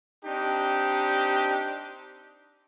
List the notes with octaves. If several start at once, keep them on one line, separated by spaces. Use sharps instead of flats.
C4 D4 D#4 G4